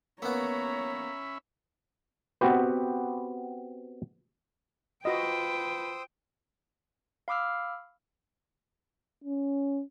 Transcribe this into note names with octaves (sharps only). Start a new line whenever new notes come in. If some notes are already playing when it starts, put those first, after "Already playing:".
A#3 B3 C#4 C#5 E5 A#5 B5
B3 C4 F#4 G4 B4
F4 F#4 B4 C5 D#5 G5 D#6 E6
F5 B5 D6 E6 F6
C#4